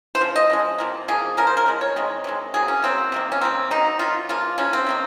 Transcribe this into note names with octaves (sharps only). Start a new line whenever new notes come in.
C5
C#3 F3
D#5
C#3 F3 G#3
C3 F3 A#3
C3 F3 A#3 G#4
C#3 F3 A#4
C5
A#4
C#3 F3 G#3
C#5
C3 D#3 G#3
C3 D#3 G#3
C3 F#3 A#3 G#4
C#4
C3 F#3 A#3 C4
C3 D#3 A#3
C#4
C3 D#3 A#3 C4
D#3 F#3 A#3 D#4
D#3 F#3 A#3 F4
C#3 F3 A#3 F4
C#3 F3 A#3 C#4
C4
C3 D#3 A#3